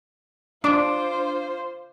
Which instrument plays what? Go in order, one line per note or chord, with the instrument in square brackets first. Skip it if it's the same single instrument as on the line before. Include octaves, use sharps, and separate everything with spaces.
[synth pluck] D4 [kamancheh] F4 C5 [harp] D6